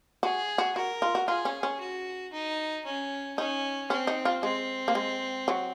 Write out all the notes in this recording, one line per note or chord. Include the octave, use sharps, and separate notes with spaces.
F#4 G#4
F#4
F#4 A#4
F4
F#4
F4 G#4
C#4
C#4
F#4
D#4
C#4
C#4 D#4
C4 C#4
D#4
F4
G#3 C4
A#3
G#3
F#3